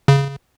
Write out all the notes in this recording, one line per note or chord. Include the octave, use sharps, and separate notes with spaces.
C#3